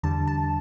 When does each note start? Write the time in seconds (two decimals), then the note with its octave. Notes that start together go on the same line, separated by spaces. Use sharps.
0.03 E2 D3 G3 A5
0.28 A5